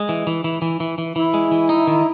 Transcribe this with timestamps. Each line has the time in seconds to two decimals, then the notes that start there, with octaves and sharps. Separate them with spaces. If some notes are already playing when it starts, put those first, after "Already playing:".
Already playing: G#3
0.09 E3
0.27 E3
0.44 E3
0.62 E3
0.80 E3
0.98 E3
1.16 E3 E4
1.34 G#3
1.51 E3
1.69 D#4
1.87 D#3